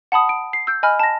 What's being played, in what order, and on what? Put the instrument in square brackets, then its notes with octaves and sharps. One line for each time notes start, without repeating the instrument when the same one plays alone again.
[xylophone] F#5 A5 B5 D#6
D7
C7
E6 G6
D#5 G#5 B5 F6
A5 A#6